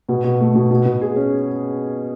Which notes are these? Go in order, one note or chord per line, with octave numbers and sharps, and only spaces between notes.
B2
B2
A3
B2
B2
B2
G#4
C#4